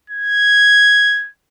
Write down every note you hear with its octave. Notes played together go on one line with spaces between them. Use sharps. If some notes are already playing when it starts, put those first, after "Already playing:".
G#6